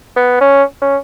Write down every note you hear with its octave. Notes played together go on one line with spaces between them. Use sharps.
B3
C#4
C#4